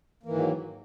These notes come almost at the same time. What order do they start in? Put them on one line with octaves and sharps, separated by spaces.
A#3 E3 G#2 D#3 F#3